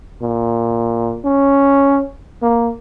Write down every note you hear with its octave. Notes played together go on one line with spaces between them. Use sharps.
A#2
C#4
A#3